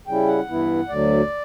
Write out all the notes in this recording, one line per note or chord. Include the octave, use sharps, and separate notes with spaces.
C#3 G3 C#4 E4 G5
F#5
G2 E3 B3 E4
D2 D3 F#3 D5